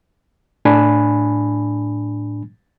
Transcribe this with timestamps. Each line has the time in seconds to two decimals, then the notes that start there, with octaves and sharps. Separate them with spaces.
0.65 A2 D4 G#5 B5